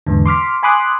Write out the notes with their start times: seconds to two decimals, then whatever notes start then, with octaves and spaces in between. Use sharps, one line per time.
0.07 E2 G#2 D3
0.26 C6 D6 F6 B6
0.63 G#5 B5 C6 D6 D#6 F#6